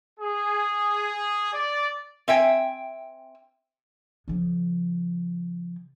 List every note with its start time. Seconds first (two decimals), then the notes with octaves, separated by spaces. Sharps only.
0.19 G#4
1.53 D5
2.28 C4 E5 G5 G#5
4.28 C#3 F3